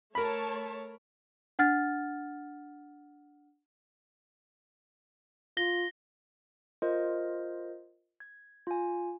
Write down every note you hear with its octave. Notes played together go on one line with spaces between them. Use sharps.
A3 A#4 C#5 A5 B5
D4 F#5 F6 A6
F4 A#6 G7
F4 A#4 C5 D#5
G#6
F4 G#5